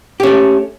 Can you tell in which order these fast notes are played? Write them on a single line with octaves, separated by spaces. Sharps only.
G4 C#4 A3